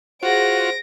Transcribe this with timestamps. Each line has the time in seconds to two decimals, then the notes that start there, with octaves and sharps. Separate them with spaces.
0.23 F4 F#4 G#4 C5 F#5 A#6 D7